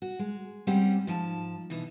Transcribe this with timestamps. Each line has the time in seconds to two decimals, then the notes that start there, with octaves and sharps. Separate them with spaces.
0.02 F#4
0.19 G#3
0.67 G3 G#3 C4 C#4 G4 F#5
1.07 G#2 F3 A5
1.70 B2 E3 D#4